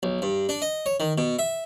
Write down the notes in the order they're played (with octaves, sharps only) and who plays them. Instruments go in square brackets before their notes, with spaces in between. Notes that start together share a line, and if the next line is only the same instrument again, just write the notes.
[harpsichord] B1
G2
D4
D#5
C#5
D#3
B2
E5